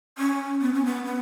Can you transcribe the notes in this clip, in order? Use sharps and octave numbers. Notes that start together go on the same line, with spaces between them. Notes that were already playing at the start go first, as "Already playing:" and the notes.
C#4
B3
C#4
B3
B3